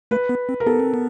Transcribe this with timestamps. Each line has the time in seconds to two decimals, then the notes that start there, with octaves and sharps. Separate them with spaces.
0.11 A3 B4
0.29 B3
0.49 C4
0.60 A#4
0.66 B3 A4
0.80 C4
0.94 B3